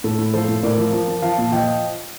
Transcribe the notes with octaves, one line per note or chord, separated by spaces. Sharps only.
A2 A4
A2
F3 A4 C5
A2
A2 A#4 D5
F3
F3
F3
F3 F5 A5
A#2
F3 D#5 G5